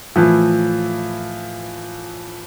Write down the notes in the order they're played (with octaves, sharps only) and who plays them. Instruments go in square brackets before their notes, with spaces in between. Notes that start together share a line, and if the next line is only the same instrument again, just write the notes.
[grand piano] A2 E3 F3